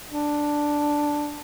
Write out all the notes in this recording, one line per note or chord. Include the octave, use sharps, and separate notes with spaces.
D4